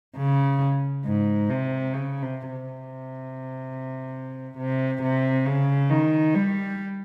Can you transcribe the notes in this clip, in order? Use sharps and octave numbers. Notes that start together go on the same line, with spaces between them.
C#3
G#2
C3
C#3
C3
C3
C3
C3
C#3
D#3
G3